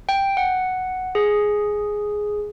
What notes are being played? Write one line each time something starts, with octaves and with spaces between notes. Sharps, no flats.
G5
F#5
G#4